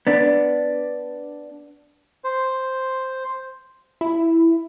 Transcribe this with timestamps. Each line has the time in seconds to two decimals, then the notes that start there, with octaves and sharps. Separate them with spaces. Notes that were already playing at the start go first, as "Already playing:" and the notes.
0.07 B3 D4
2.24 C5
4.01 E4